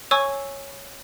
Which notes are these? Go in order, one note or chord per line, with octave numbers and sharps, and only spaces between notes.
C#5 G#5 C#6 E6